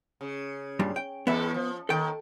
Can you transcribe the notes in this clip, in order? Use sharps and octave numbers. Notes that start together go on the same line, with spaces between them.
C#3
G2 A#2 G3
G5
E2 B3 C4 A4 B4 E5
F3
D#2 D#3 A4 G5